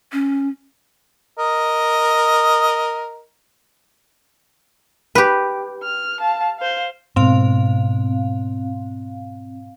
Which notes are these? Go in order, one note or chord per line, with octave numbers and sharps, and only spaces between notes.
C#4
A#4 D#5
G4 B4
F6
F5 A5
C5 F5
G#2 B2 C4 F5